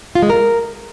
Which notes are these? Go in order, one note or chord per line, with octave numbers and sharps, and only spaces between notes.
F4
G#3
A#4